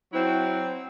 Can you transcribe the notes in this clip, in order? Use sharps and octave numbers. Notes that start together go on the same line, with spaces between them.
F#3 C4 E4 F#4